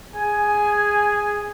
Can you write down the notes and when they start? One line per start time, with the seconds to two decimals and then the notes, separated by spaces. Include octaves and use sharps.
0.15 G#4 G#5